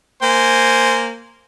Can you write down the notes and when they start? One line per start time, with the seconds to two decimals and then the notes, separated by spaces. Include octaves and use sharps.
0.22 A#3 C5 G#5